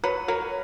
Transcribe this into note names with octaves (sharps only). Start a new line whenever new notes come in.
F#3 B4
F#3 A#4